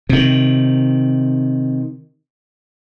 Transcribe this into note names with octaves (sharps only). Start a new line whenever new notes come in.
C3 D#3